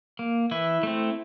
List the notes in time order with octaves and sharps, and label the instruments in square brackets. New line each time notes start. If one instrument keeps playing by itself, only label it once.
[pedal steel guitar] A#3
E3 E4
A3 C4